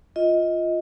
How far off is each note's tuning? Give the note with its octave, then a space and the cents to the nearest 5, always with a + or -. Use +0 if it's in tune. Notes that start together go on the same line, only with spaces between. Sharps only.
F4 +0 D#5 +15